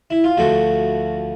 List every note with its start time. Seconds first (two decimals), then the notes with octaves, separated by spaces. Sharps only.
0.10 E4
0.24 F4
0.37 D2 D3 F3 A3 F#4